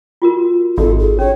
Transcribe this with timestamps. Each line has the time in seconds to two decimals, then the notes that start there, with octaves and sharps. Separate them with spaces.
0.22 F4 F#4 A#4
0.78 G#1 F#4 A4
1.00 G#4
1.19 C#4 C#5